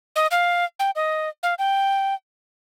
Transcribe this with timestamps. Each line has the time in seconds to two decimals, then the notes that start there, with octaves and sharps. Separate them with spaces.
0.16 D#5
0.31 F5
0.79 G5
0.96 D#5
1.43 F5
1.59 G5